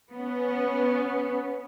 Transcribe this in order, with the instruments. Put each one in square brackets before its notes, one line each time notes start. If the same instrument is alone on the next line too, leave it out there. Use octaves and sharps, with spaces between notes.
[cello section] B3 C#4